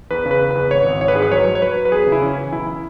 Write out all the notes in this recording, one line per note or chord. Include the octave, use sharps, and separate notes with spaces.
E2 B4
C#3
B4
C#3
E2 B4
G#1 C#5
G#1
E3 C#5
B4
G#2 G#4
B4
F#3 C#5
F#3
C#5
F#3 B4
F#3
B4
E2 G#4
C#3
E4
E3 C#4
E3
B1 E4